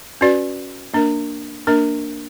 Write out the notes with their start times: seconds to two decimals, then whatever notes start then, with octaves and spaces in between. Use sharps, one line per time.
0.21 C#4 F#4 B4 D5
0.94 A#3 D4 A#4
1.67 A#3 D4 A#4